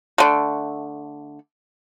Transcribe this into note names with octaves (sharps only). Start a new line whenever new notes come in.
D3 A3